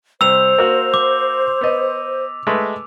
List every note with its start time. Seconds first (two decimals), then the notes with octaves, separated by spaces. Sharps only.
0.21 C2 C5 E6 F7
0.58 A#3 F#4
0.94 D6
1.61 B3 D#5
2.47 G#3 A3 B4